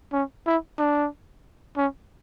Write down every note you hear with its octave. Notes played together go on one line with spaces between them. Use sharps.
C#4
E4
D4
C#4